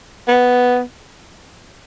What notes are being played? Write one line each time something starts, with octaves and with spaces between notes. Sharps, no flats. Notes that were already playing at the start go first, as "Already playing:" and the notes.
B3